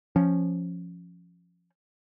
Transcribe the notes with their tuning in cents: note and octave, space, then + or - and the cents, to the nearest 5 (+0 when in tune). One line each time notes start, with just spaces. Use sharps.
F3 +0 C#4 +0